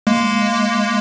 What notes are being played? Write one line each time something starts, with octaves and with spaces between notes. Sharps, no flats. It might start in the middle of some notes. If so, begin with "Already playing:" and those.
G#3 A#3